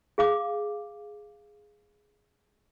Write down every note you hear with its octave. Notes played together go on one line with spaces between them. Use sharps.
G#4 F5 D6